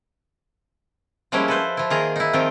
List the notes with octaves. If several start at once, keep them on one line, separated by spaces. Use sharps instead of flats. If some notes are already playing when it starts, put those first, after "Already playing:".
F3 G3 G#3 A#3 C#4 E4
A4 B4 C5
F3 E4
D#3 A#3 F4 G#4 A#5
D#4 E4
D#3 F3 C4 F4